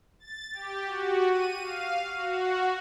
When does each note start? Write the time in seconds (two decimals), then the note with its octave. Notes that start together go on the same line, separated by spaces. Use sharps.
0.20 A6
0.53 G4
0.85 F#4
1.29 D#7
1.61 F5
2.16 F#4